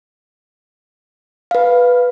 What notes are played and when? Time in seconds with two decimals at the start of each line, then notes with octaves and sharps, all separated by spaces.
1.51 B4 F5